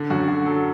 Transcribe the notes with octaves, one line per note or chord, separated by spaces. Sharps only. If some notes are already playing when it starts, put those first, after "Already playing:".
Already playing: D3
F#2 F#4
D3 F#4
F#3 A4